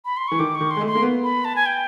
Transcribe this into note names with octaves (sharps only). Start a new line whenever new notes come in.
B5
C6
E3 C#6
D#3 D6
C#6
D#3
C6
G#3
A3
C6
A#3
B3
B5
A5
G#5
G5